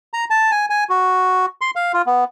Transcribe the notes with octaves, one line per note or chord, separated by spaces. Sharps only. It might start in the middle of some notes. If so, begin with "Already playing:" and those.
A#5
A5
G#5
G#5
F#4
C6
F5
F4
B3